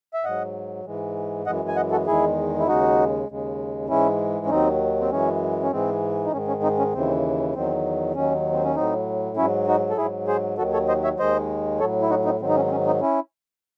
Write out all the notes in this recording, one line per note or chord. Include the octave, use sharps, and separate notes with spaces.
E5
G#2 F#3 D#5 F#5
G#2 E3 G#3
F#2 E3 G#3 D#5 F#5
G#5
D#5 F#5
F#4 A4
E2 D#3 G#3 E4 G#4
E4
D#2 C#3 G#3 D#4 F#4
D#2 C#3 G#3
G#2 E3 G#3 C#4 E4
C#4
D#2 D#3 F#3 C4 D#4
C4
F#2 E3 G#3 C#4
C#4
G#2 E3 G#3 C4
D#4
G#2 D#3 G#3 C#4
C#4
C4 D#4
C#4
D#2 C#3 E3 C4
E2 D#3 F#3 C4
D#2 D#3 F#3 C#4
C4
C#4
A2 F#3 C4 D#4
G#2 F#3 C#4 E4
D#4 F#4
A4
G#2 F#3 E4 G#4
G#4 C5
D#2 D#3 F#3 F#4 A4
A4 C#5
C5 D#5
C#5 E5
D#2 D#3 G#3 C5 D#5
A2 F#3 A4 C#5
E4
D#4 F#4
C4 D#4
G#2 D#3 F#3 C4
D#4
C#4
C4
C#4
C4 D#4
C#4 E4